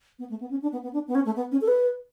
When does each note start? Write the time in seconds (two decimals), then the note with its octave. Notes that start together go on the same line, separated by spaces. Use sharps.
0.19 B3
0.29 A3
0.40 B3
0.50 C#4
0.62 D4
0.72 B3
0.83 B3
0.93 D4
1.08 B3
1.15 C#4
1.25 A3
1.36 B3
1.52 C#4
1.61 A4
1.68 B4